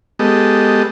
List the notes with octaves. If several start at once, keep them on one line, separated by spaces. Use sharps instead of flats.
G#3 B3 G4 A4 D#5